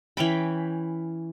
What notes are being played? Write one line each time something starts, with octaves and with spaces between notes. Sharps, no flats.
E3 C#4 G5 B5